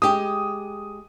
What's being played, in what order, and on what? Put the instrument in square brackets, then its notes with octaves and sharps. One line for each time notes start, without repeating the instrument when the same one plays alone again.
[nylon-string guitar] G#3 G4 [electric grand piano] D#6